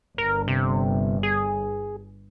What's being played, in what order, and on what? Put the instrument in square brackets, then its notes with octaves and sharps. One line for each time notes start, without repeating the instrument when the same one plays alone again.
[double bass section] G1 [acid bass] A#4
[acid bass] C3
G#4